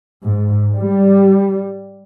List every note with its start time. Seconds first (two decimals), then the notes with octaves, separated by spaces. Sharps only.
0.24 G#2
0.74 G3